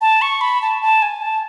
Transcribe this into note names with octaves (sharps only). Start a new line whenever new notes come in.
A5
C#6
B5
A5
A5
G#5
A5